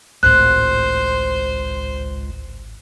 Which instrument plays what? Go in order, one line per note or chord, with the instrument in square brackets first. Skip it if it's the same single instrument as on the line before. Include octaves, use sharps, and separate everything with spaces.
[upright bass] G#1 A2 [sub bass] C#2 [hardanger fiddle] C5 [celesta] F#6